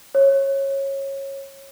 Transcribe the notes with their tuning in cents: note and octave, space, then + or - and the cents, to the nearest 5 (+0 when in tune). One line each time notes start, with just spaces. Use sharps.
C#5 -20